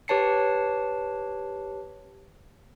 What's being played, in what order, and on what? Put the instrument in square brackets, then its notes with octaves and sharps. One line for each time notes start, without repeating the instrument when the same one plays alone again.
[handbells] G4 B4 C#5 A5 C7 C#7